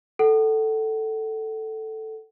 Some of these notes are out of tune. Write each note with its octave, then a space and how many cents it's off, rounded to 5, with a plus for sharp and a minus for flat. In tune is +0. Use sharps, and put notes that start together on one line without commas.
A4 +0 F#5 +35